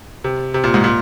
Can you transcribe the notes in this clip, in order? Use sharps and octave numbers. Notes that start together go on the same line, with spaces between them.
C3
C3
A#2
G#2
A#2